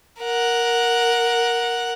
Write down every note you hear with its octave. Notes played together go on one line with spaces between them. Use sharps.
A#4 F#5